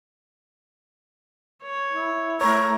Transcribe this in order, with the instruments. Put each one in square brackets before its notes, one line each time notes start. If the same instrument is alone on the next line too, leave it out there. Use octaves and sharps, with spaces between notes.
[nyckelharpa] C#5
[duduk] E4
[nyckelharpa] A3 [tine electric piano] C#5 [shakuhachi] A#5